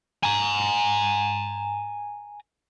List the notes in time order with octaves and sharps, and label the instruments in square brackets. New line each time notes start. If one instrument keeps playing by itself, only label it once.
[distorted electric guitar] G#5 A#5